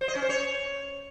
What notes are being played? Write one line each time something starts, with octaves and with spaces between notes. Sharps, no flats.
C5
D#5
C#4
C5
C#5